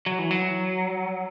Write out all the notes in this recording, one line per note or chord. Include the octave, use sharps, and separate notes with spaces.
F#3
E3
F#3